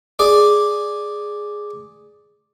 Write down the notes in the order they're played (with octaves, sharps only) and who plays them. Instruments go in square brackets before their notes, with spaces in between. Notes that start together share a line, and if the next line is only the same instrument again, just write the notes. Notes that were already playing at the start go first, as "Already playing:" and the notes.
[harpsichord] G#4 D5